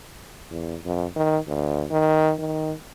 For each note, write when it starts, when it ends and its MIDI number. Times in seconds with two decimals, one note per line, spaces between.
0.51 0.77 40
0.85 1.05 41
1.16 1.38 51
1.48 1.85 38
1.91 2.33 51
2.39 2.72 51